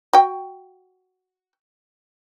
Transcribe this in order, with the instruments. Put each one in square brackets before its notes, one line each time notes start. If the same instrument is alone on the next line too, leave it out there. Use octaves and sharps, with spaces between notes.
[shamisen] F#4 G5